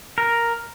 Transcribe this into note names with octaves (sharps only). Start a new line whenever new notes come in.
A#4